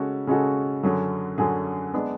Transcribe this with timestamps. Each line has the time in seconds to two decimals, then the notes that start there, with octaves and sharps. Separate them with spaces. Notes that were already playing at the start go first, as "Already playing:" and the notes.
Already playing: C#3 G#3 C#4 F#4 A4
0.27 C#3 G#3 C#4 F#4 A4
0.83 F#2 D3 F#3 C#4 G#4
1.38 F#2 D3 F#3 C#4 G#4
1.94 G#3 B3 D4